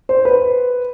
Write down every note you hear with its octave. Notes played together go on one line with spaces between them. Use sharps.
C5
B4